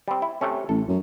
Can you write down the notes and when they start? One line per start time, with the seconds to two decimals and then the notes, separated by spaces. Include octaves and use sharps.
0.08 G3 C4
0.22 E4
0.41 C3 A3 C#4
0.69 A1 A4
0.88 F#2